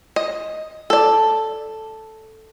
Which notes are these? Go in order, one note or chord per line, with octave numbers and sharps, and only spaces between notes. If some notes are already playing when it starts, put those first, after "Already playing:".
D#5
A4 D5